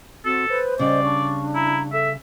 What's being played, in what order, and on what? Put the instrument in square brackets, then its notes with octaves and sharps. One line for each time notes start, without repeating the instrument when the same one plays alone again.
[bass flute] C4 [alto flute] F#4 [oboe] A4
[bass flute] B4 [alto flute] C5
[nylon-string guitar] C#3 G3 [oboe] D5 [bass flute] D#5
[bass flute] D4 [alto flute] C#6
[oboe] E4 [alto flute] A#5
[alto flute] A4 [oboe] E5